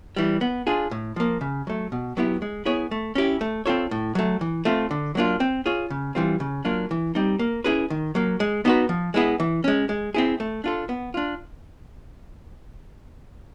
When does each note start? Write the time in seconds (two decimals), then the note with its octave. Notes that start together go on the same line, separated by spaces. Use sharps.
0.16 E3 G3
0.41 B3
0.67 D4 F4 G#4
0.91 A2
1.16 F3 A#3
1.41 C#3
1.67 F#3 A3
1.92 B2
2.17 F#3 B3 E4 G4
2.42 G#3
2.65 B3 E4 G#4 C#5
2.91 A3
3.15 C#4 E4 G4
3.41 A3
3.66 C4 F4 A4 C#5
3.91 A2
4.15 F#3 A3
4.41 E3
4.65 A3 C4 F4
4.91 D3
5.15 F#3 A#3 D4 F4
5.40 C4
5.66 F4 G#4 C#5
5.90 C#3
6.15 E3 G3 C4 F4
6.40 C#3
6.65 F#3 A#3 D4 F4
6.91 E3
7.15 G3 C4 D#4
7.39 A#3
7.64 C#4 E4 G#4 B4
7.90 D#3
8.15 F#3 A#3
8.40 G#3
8.65 B3 D#4 F#4 B4
8.89 F3
9.14 G#3 B3 E4 G#4
9.40 E3
9.64 G#3 C#4
9.89 G#3
10.14 C4 E4 G#4
10.40 A3
10.64 D4 F4 A4
10.89 B3
11.14 D4 F4